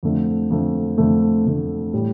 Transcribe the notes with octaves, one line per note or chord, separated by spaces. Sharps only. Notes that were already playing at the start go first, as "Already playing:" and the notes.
F2 D3 A3
F2 D3 A3
F2 D3 A3
F2 D3 A3
A2 G3